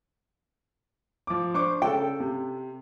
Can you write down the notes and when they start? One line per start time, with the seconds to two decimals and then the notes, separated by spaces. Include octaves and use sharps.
1.27 F3 D6
1.54 D4 C5 C#6 D6
1.82 C#3 A4 G5
2.20 C3